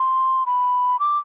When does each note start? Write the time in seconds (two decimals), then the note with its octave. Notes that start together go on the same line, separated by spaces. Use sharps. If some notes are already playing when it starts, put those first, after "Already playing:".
Already playing: C6
0.46 B5
0.99 D6